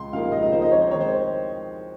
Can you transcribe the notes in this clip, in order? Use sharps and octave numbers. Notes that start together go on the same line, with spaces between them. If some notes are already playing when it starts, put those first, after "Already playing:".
Already playing: C#2 C6
C#3 F3 A#3 D#4 F5
C#2 D#5
D#5
C#3 F3 A#3 D#4 C5
D#5
F2 C#5
C5
D#3 C#5
G#3 C5